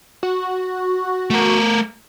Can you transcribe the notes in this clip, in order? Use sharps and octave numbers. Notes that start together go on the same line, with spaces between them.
F#4
A3 A#4